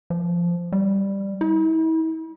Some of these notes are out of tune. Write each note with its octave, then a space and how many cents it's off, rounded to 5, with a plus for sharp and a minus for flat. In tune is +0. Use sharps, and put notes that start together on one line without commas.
F3 -10
G3 +5
E4 -40